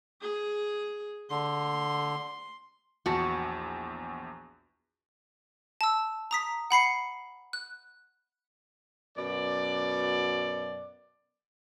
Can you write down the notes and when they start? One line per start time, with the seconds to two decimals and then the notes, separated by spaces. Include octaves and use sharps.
0.22 G#4
1.30 D3 C6
3.06 A#1 E2 F#4 A5
5.81 A5 E6
6.31 A#5 D#6 B6
6.71 F#5 B5 C7 C#7
7.53 F#6
9.17 F#2 B2 D5